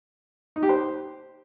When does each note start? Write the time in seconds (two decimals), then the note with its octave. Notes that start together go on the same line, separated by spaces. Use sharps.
0.56 D#4
0.63 G4
0.69 C5